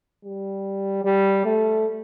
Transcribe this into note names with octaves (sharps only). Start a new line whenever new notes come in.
G3
G3
A3